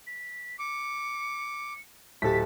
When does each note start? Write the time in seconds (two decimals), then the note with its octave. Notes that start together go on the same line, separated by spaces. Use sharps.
0.07 B6
0.59 D6 C#7
2.22 D1 G4 A4 A5 B6